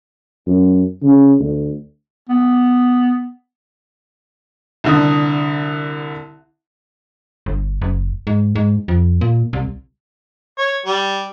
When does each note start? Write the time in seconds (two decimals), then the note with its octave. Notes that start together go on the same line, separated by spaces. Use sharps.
0.47 F#2
1.03 C#3
1.40 D2
2.29 B3
4.84 C2 D3 D#6
7.46 G1
7.82 F#1
8.27 G#2
8.55 G#2
8.88 F2
9.21 A#2
9.53 C2
10.58 C#5
10.86 G3